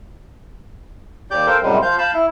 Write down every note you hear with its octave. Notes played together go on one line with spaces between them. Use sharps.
D#2 G4 D5 D6 G6
A4 A#4 C5 F5 G5
F#2 A2 C3 G3 G#3
F3 F5 G6
F5 A5 B5 G6
E4